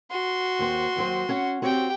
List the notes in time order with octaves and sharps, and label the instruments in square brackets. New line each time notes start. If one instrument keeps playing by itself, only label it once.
[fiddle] F#4 C6
[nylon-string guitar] D#2 C5
D#2 F#3 C5
C#4 C#5 F#5
[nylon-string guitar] C4 F#4 C#5 [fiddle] G4 G5